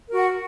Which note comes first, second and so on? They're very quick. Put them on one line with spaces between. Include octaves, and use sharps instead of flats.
A#4 F#4 F#5